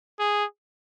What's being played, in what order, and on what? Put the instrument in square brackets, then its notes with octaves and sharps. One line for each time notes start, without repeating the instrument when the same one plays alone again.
[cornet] G#4